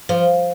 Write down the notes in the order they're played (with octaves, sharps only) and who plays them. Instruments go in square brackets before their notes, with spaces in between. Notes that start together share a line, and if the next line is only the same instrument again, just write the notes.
[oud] F3